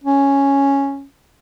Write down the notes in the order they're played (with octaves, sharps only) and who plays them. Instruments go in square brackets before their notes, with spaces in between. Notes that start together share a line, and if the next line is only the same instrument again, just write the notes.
[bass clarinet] C#4